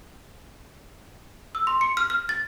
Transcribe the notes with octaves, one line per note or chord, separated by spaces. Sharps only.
E6
C6
C#7
F6
F6
A6